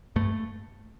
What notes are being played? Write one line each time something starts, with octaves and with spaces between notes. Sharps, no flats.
G2 A3